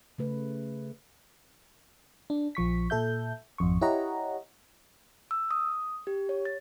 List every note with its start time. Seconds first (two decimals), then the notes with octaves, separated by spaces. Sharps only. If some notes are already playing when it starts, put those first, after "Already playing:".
0.18 C#3 A3 B4
2.30 D4
2.55 A#1 F3 C#6 B6
2.90 A#2 A4 E5 G6
3.58 G#1 F2 C#6
3.81 E4 G4 C#5 D#5 F#5 A#5
5.31 E6
5.51 D#6
6.07 G4
6.29 C#5
6.45 A6